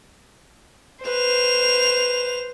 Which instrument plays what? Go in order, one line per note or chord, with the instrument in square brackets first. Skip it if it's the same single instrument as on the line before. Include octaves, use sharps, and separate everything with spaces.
[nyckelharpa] B4 [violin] C5 F7